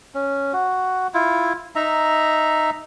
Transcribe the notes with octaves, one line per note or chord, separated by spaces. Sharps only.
C#4
F#4
E4 F4
D#4 E5 A#5